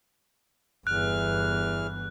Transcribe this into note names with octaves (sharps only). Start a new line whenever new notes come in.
G1 E2 E3 F6 F#6